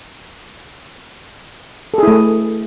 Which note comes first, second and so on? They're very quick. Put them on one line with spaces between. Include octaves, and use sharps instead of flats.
A4 G#4 E4 A3